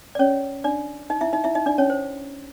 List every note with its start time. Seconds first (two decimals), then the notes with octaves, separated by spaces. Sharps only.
0.15 D5
0.19 C#4 C#5
0.64 D4 D5
1.10 D#4 D#5
1.21 E4 E5
1.33 D#4 D#5
1.44 E4 E5
1.55 D#4 D#5
1.66 D4 D5
1.78 C#4 C#5
1.90 C5